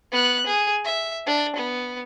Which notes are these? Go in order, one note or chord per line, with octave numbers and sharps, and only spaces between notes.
B3 F#6
G#4
E5
D4
B3